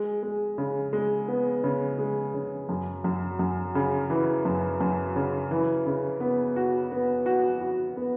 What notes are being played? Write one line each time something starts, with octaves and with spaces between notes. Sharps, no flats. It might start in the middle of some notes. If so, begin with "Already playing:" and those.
Already playing: G#3
G#3
C#3
G#3
B3
C#3
G#3
C#3
F#2
F#2
F#2
C#3
E3
F#2
F#2
C#3
E3
C#3
B3
F#4
B3
F#4
F#4
B3